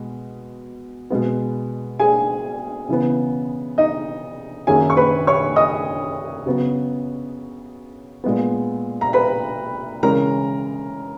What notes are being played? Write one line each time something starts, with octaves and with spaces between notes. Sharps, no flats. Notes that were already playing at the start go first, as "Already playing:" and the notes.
Already playing: B2 G#3
B2 G#3 B3
G#4 G#5
C#3 E3 B3
D#4 D#5
F#2 D#3 A#3 C#4 G#4 G#5
C#6
B4 B5
C#5 C#6
D#5 D#6
C#3 F#3 B3
A#2 G#3 B3
A#5
B4 B5
C#3 E3 G#3 C#4 A#4 A#5